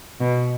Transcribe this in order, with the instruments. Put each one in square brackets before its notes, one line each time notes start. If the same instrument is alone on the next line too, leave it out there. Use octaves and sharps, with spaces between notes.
[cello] B2